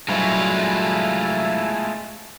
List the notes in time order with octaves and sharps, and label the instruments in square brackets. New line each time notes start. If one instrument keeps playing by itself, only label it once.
[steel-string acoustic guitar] G2 F#3 [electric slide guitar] G#3 A3 F4 [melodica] E4 G#5